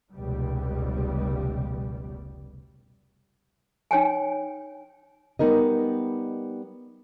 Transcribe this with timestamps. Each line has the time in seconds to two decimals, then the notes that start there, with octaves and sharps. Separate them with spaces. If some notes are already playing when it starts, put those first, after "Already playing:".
0.12 F1 C#2 B2 G3
3.91 D#4 C#5 G5 G#5
5.39 G3 B3 D#4 A#4 D#5